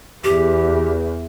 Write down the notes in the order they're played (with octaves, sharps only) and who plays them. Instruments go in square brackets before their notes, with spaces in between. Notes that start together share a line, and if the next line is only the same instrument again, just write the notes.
[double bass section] E2 [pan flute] G4